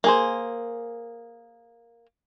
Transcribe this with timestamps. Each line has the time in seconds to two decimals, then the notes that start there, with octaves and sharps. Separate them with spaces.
0.04 A#3 G#4 C5